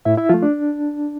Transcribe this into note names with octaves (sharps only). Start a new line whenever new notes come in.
A2 E4 E5
E4 E5
F3 A3 F4
D4